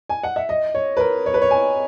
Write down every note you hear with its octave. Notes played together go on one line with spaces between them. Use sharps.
G#5
F#5
E5
D#5
C#5
B4
A#4
C#5
B4
C#5
G#5